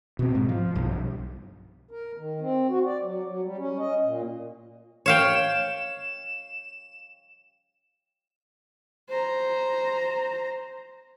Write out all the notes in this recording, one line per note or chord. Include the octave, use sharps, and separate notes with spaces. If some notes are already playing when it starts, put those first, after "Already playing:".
B2 C4
G#2
F3
B1 G2
A#4
D#3
C4
F#4
D5
F#3
F#3
G3
C#4
D#5
A#2
C#5 F5 G5 E7
C5 A#5